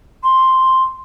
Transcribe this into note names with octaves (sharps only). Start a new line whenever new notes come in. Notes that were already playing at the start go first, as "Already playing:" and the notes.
C6